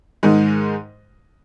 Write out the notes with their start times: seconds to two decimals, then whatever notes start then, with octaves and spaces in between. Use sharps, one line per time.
0.23 G#2 D#3 G#3 D#4